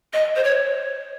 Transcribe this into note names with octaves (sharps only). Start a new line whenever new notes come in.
D#5
C5
C#5